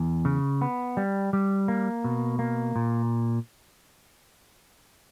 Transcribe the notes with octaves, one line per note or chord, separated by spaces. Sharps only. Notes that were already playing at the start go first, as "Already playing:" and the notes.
Already playing: E2
C#3
B3
G3
G3
A#3
B2
A#3
A#2